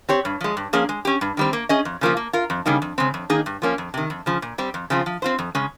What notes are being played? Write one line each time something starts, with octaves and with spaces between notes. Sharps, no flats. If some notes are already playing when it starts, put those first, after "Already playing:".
C4 G4 C#5
G2
F3 G#3
G2
F3 A#3 C#4 G#4
G#3
C#4 G4
G2
D#3 G3 C4
A#3
C#4 G#4 D#5
F2
C#3 F3 A#3 F4
A#3
F4 A#4
F2
C#3 G3 A#3 D#4
F2
C#3 G#3 C4
F2
D#3 A#3 D#4 G#4
G2
F3 A#3 C#4
F2
C3 D#3
F2
C#3 F3
A#2
G3 C4 G4
F2
C#3 F3 C4 F4
F3
C4 F4 C5
F2
C#3 G#3 C#4